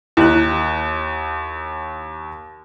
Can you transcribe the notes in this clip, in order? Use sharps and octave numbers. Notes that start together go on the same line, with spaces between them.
D#2 E4 F#6